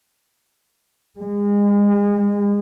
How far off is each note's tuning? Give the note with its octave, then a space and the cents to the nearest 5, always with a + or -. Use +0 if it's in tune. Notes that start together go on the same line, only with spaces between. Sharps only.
G#3 -30